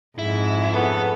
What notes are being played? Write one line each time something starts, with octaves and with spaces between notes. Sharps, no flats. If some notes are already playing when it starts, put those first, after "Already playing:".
F2 G#2 E4
C#3 A3 B3 A4